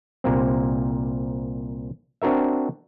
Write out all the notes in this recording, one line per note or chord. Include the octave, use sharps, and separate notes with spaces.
C2 A#2 A#3 C4
C4 D4 F#4 A#4 E5